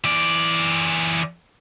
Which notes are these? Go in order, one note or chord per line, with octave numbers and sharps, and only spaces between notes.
E3 D5